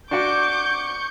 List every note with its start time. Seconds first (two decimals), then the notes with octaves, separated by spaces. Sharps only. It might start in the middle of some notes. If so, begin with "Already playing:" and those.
0.11 D4 F#4 F#5 C#6 D6 G6